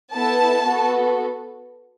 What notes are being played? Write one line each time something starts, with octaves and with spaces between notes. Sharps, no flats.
B3 E4 A4 A5
B3 F#4 A4